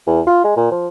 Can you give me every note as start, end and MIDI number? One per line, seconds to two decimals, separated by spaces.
0.07 0.21 40
0.27 0.40 65
0.44 0.54 56
0.57 0.71 46
0.72 0.88 53